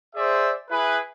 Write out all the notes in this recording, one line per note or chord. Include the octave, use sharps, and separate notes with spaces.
G#4 C5 D5 E5
E4 G#4 B4